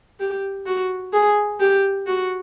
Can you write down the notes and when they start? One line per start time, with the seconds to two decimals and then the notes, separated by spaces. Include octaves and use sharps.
0.20 G4
0.66 F#4
1.13 G#4
1.60 G4
2.07 F#4